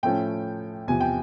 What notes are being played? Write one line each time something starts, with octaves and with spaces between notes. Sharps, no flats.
A2 F3 A3 C#4 G5
E2 C3 F3 G#5
G5